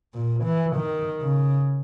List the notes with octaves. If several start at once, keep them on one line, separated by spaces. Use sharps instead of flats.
A#2
E3
D#3
C#3